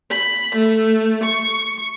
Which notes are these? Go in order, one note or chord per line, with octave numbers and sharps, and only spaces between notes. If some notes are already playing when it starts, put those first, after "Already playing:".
B5
A3
C#6